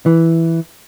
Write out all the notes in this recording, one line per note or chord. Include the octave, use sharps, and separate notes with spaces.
E3